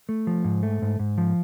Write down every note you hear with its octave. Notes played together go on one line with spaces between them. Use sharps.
A3
F3
G#2
A3
G#2
G#2
F3